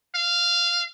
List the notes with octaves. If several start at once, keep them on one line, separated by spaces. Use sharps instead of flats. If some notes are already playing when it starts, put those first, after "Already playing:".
F5